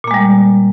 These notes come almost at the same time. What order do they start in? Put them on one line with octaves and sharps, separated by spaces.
A#2 A#3 G#3 G3